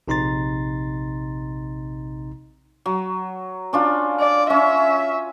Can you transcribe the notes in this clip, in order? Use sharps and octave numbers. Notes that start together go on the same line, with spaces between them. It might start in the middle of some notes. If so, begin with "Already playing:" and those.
A#1 C3 D#4 A#5 C6 A6
F#3
C#4 D4 F4
D5
C#4 E5